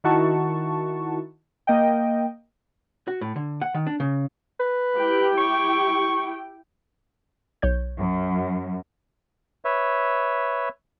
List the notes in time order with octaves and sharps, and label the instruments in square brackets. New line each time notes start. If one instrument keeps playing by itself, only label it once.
[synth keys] D#3 E4 F#4 A5 C#6
A#3 D#5 G5
[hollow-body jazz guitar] F#4
A2
D3
F#5
D#3
D4
C#3
[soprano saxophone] B4
[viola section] E4 G4 G5
[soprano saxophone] C#6
[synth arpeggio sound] B1 C#5 G6
[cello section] F#2
[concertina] B4 C#5 E5